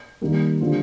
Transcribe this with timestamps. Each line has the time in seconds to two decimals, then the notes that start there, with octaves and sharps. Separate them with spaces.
0.21 D#3 G3 A#3
0.61 D3 G3 C4 F4